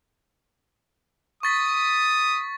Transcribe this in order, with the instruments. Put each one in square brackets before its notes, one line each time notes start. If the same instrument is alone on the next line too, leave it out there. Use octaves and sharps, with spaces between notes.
[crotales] C#6 A6 B6 [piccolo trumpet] D#6